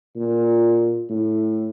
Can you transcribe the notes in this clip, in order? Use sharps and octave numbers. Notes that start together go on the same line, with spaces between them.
A#2
A2